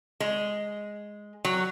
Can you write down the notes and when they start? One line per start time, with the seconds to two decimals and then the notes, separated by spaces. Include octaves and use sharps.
0.20 G#3
1.45 F#3